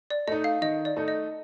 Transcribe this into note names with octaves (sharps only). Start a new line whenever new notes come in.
D5
A3 D#4 D#5
F5
D#3 D#5
D5
A3 D#4
D#5